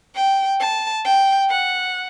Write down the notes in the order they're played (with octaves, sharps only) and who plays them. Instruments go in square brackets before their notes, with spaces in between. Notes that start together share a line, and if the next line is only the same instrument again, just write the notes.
[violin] G5
A5
G5
F#5